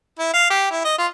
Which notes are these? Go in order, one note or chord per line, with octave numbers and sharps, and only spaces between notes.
E4
F5
G4
E4
D#5
F4